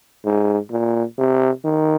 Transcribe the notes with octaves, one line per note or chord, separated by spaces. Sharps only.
G#2
A#2
C3
D#3